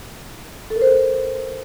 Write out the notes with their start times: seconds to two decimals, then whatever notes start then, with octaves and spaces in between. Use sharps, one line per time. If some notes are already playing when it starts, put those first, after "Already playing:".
0.70 A4
0.76 A#4
0.81 C5
0.87 A4